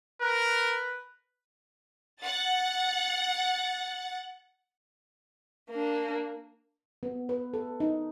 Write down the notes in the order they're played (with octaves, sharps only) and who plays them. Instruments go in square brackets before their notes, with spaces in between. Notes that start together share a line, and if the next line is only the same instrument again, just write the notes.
[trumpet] A#4 [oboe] B4
[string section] F#5 A6
[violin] A#3 D4
[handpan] B3
B4
A4
D#4